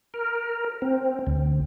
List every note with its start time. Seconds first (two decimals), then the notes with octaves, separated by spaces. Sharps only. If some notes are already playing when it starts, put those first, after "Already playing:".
0.14 A#4
0.82 C4
1.27 D2